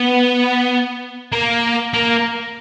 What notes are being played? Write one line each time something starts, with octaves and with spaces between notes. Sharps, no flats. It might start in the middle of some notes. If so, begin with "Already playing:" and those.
Already playing: B3
A#3
A#3